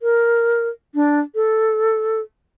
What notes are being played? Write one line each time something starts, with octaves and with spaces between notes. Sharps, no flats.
A#4
D4
A4